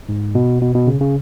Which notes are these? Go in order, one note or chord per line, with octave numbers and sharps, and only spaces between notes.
G#2
B2
B2
B2
C#3
C#3